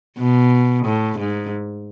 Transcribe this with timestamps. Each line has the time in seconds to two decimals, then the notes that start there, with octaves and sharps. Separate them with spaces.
0.19 B2
0.85 A2
1.19 G#2